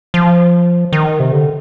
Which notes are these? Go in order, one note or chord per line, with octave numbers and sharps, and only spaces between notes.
F3
D#3
C3
D3